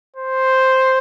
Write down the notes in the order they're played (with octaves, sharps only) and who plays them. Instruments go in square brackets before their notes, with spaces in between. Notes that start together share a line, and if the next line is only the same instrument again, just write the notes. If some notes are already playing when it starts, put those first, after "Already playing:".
[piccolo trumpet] C5